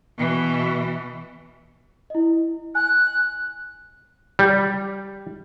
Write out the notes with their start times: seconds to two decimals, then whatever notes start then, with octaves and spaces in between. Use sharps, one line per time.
0.17 B2 E3
2.10 E4 D#5
2.75 G#5 F#6
4.39 G3